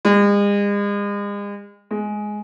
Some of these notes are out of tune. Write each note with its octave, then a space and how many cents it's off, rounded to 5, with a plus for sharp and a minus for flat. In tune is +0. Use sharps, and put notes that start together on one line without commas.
G#3 -40
G#3 +10